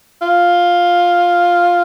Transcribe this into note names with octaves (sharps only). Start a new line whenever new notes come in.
F4